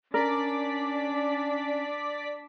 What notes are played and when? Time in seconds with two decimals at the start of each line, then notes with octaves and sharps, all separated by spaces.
0.14 C#4 D4 A#4 D5 B6